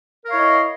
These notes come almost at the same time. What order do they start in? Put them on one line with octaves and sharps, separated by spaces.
A#4 F5 C#5 E4 D#5